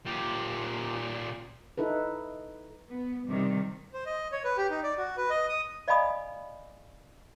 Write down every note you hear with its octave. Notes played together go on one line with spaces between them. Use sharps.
A#2 G4
D#4 E4 A4 B4
B3
C3 D#3 G3
C5
D#5
C#5
B4
G4
D#4
D5
F#4
B4
D#5
D#6
D5 D#5 F5 G#5 B5 D#6